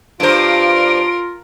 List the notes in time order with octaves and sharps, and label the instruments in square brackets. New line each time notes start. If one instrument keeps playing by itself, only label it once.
[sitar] G2 C5 [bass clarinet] F4 [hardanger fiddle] A#4 [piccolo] D7